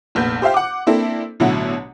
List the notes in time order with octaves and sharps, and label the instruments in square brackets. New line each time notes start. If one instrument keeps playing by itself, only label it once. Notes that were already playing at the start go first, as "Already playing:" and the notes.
[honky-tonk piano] F1 A#1 B3 G6
G4 C5 E5 F5 G5
F#5 D6
A#3 C4 D4 E4 A4
A1 B2 D3 F#3 E4